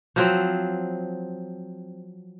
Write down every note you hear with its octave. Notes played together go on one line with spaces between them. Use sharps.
F3 F#3 C4